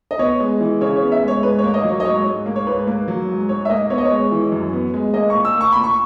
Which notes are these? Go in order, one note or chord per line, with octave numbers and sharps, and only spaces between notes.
D#5
B3 C#5
G#3
E3
C#3 C#5
C#5
B3
E5
G#3
C#5
G#2 B4
C#5
A#3
D#5
F#3
C#5
D#5
G#2 C#5
G#2
A#3
C#5
G#2 B4
A#3
F#3
G#2
G#2 C#5
E5
A#3 D#5
B3 C#5
D#5
C#5
G#3
E3
F#2
B3
G#3
A#3 D#5
C#6
A#2
E6
A#3
C#6
A#2 B5
C#6